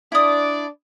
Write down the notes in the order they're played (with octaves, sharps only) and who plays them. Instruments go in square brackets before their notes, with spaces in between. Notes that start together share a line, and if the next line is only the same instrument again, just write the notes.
[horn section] D4 D5 [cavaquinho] E4 D#6